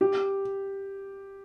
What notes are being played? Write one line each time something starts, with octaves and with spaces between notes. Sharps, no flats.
G4